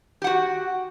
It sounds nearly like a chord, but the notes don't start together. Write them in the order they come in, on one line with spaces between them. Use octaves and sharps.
G4 F#5 F#4